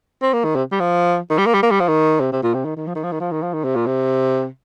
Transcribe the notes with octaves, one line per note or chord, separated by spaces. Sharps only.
C4
A#3
D#3
C3
G3
F3
D#3
G3
A#3
G3
A#3
G3
F3
D#3
C3
C3
A#2
C3
D#3
D#3
F3
D#3
F3
D#3
F3
D#3
F3
D#3
C3
A#2
C3